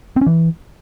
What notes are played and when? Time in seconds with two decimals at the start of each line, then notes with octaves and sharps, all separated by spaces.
0.16 C4
0.21 C#4
0.26 E3